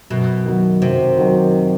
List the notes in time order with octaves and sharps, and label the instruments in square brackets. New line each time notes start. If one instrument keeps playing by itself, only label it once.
[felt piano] F#2 [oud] B2
[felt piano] D#3 F#3
[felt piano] F#2 [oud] C3
[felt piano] D#3 F#3